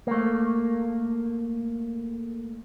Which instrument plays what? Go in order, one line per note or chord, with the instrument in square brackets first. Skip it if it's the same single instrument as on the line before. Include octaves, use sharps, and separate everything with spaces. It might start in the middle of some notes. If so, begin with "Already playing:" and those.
[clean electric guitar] A3 A#3